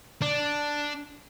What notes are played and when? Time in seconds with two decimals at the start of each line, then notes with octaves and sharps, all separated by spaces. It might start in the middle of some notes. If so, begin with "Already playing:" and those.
0.22 D4